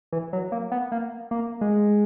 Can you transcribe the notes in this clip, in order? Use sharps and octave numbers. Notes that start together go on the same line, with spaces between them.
E3
F#3
A#3
B3
A#3
A#3
G#3